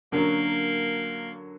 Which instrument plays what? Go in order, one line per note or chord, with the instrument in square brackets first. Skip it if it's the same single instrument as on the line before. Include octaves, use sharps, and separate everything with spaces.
[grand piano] D3 F#3 C#4 F#4 A#4 [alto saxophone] A#3